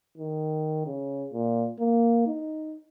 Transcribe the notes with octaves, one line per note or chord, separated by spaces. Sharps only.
D#3
C#3
A#2
A#3
D#4